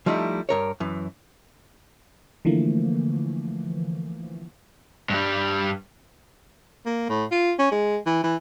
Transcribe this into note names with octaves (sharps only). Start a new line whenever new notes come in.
F3 G3 A3 D#4 E4
G2 A#4 C#5
F#2 E3
D3 E3 F3 A3 A#3
G2 G3
A#3
A2
F4
C#4
G#3
E3
E3